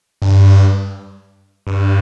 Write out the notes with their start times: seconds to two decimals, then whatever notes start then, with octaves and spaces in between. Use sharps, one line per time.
0.22 G2
1.67 G2